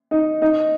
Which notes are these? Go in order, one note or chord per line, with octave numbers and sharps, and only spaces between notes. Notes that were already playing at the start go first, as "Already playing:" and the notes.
D#4
D#4